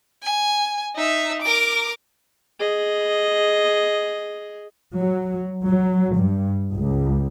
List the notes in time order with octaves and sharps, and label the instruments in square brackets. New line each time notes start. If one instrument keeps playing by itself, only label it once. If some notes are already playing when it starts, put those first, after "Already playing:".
[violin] G#5
D#4 E5
A#4 D6
[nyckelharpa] G#4 D#5
[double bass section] F#3
F#3
G2
C#2